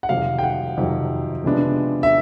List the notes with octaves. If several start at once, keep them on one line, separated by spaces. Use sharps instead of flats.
F#5
F2 C3 D#3 F#3 F5
G5
F#5
F2 C3 D#3 F#3
C3 F3 G#3 B3 D4
E5